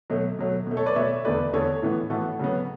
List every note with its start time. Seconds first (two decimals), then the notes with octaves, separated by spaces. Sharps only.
0.10 B2 F#3 A3
0.39 B2 F#3 A3
0.67 B2 A3
0.77 A4 C#5
0.86 B4 D5
0.95 B2 A3 C#5 E5
1.25 E2 D3 A3 B4 D5
1.53 E2 D3 A3 A4 C#5
1.82 A2 E3 B3
2.10 A2 E3 B3 F#4 A4
2.39 C#3 F#3 B3